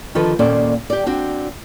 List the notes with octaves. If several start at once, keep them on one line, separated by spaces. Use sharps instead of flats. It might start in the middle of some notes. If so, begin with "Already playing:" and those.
D3 D#3 F3 A4 B4
D#2 A#2 C#4 A4 C5 D5
G4 D5
C4 D4 F#4